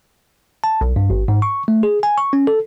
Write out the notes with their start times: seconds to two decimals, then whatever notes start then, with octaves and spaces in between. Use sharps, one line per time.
0.64 A5
0.81 B1
0.96 G2
1.10 G#1
1.28 G#2
1.42 C#6
1.68 A3
1.83 G#4
2.03 G#5
2.18 C#6
2.33 C#4
2.47 A4